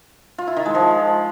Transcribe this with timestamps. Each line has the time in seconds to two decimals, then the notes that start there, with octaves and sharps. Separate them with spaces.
0.38 F4
0.47 E4
0.57 D#3
0.66 G#3
0.75 F3